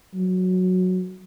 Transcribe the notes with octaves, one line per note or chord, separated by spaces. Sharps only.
F#3